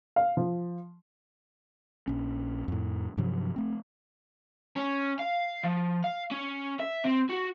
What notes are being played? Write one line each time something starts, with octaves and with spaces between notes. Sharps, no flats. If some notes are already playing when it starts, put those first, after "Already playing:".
F5
F3
A#1 C#4
F2 A2
G2 C3 F3 F#3
A3 C4
C#4
F5
F3
F5
C#4
E5
C4
F#4